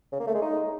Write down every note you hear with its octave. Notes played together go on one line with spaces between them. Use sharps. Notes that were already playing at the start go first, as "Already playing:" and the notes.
C#3
A#3
A3
G#3
D#4